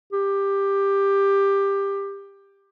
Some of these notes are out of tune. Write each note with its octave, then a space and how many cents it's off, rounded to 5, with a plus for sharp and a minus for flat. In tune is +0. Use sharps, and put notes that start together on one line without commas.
G4 +15